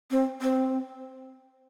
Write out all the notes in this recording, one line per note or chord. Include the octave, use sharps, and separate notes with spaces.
C4
C4